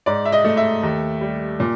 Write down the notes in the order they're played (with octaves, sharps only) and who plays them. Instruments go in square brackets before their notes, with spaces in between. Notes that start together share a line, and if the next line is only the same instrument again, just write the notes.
[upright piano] G#2 D5
E5
D#5
A3
E5
D#2
G3
A#2